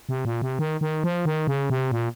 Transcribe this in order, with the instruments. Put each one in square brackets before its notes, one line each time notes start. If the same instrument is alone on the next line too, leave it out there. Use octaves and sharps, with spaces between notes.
[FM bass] C3
A#2
C3
D#3
D#3
F3
D#3
C#3
C3
A#2